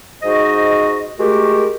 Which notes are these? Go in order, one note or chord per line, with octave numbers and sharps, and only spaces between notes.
G#2 F#4 C5 D#5
G#3 A3 F#4 G4 A#4